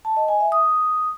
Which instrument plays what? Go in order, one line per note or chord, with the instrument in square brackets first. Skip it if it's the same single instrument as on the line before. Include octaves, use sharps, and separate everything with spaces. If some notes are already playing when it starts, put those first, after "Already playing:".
[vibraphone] A5
D#5
G#5
E5
D#6